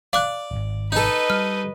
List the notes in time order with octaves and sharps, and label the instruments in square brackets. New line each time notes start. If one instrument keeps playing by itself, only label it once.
[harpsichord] D5 [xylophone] F5 D6 F#6
[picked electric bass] D1 G#1
[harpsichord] D#4 A4 [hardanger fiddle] B4 D#5
[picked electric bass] G3 [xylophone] F6